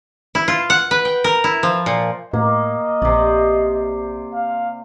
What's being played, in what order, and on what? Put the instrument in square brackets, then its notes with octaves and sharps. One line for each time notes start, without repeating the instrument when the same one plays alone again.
[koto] E4
F4
F#5
B4
G5
A#4
E4
F3
A#2
[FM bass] A2 [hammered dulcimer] A#3 [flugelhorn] D#5
[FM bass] A#1 [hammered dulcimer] C3 D5
[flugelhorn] F5